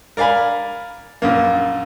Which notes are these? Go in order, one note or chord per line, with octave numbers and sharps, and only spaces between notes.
A#4 D5 F5 G#5 B5
A#1 F#2 A#3